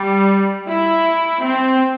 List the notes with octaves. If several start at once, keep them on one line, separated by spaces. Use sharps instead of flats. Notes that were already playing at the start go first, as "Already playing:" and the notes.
Already playing: G3
E4
C4